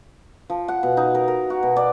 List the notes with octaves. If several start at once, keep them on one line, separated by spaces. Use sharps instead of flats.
F3
F#5
B2
D#4
A#4
A#4
F#4
B2
D5